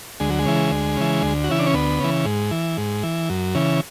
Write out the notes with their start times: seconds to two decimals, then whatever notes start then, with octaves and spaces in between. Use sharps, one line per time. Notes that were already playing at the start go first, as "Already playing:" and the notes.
0.20 D2 G#3
0.29 F#3
0.39 G#3
0.46 C#3 E3
0.71 D2
0.97 C#3 E3
1.23 D2
1.44 F#4
1.49 C#3 E3 E4
1.59 D4
1.67 C#4
1.74 D2 B3
2.00 C#3 E3
2.25 G#2
2.51 E3
2.77 G#2
3.03 E3
3.30 F#2
3.55 C#3 E3